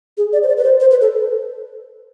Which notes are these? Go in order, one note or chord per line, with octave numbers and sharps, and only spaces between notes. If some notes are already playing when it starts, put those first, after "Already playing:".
G#4
D5
C5
D5
B4
C5
C5
B4
A4